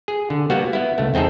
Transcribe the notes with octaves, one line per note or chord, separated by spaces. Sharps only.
G#4
D3
G3 A#3 B3 F#4
B3 E4
C#2 A3
E2 C4 D#4 G#4 A4